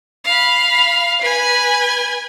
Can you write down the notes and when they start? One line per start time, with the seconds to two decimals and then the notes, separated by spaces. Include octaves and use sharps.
0.25 F5 B5
1.22 B4 G#5